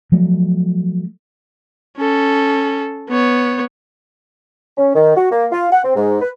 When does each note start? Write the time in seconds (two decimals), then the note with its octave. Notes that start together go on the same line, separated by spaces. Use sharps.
0.12 F3 F#3 A3
1.97 C#4 A4
3.09 B3 C#5
4.77 C#4
4.95 D#3
5.16 F#4
5.31 A#3
5.52 F4
5.72 F#5
5.84 C4
5.96 G#2
6.21 B4